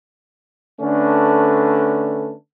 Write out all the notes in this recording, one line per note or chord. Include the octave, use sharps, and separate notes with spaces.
D3 A3 C#4 D4 A4 B4